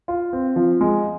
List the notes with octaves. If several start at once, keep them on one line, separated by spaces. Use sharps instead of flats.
F4
C4
F3
G#3